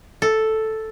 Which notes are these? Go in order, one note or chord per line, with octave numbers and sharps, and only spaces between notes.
A4